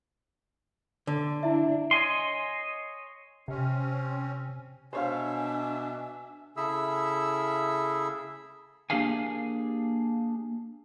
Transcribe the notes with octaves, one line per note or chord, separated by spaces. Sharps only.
D3
D4 E4 E5
C#5 D#5 G#5 C6
C3 C4 C#4
B2 D4 C5 C#5 E5 F5 G#5
C#3 E4 G#4 A4 E5 E6
A#3 D4 G4 G#4 F5 G#5